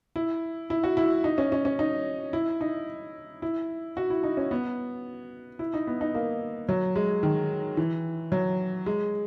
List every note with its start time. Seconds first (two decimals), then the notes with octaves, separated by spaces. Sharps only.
0.16 E4
0.70 E4
0.84 F#4
0.97 E4
1.24 D#4
1.38 C#4
1.52 C#4
1.65 C#4
1.79 D#4
2.33 E4
2.61 D#4
3.42 E4
3.97 F#4
4.10 E4
4.23 D#4
4.37 C#4
4.51 B3
5.59 E4
5.74 D#4
5.87 B3
6.01 D#4
6.15 A#3
6.69 F#3
6.96 G#3
7.23 D#3
7.77 E3
8.32 F#3
8.86 G#3